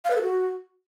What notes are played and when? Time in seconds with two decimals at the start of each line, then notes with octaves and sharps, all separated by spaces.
0.05 F5
0.10 B4
0.16 A4
0.22 F#4